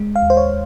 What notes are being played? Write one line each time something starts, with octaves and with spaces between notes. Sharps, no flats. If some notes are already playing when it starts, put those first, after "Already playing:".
Already playing: G#3
F5
D#2
C5
C#5